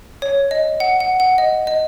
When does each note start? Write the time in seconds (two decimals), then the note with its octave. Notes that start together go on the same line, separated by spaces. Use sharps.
0.22 C#5
0.51 D#5
0.80 F#5
1.00 F#5
1.20 F#5
1.38 D#5
1.67 D#5